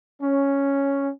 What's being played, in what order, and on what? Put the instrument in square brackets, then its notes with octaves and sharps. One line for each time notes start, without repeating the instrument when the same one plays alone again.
[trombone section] C#4